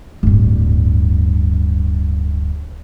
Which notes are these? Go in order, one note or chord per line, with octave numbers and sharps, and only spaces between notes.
D1 G2